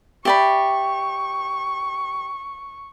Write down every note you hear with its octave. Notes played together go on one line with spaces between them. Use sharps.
G4 D5 E5 G5 B5 C#6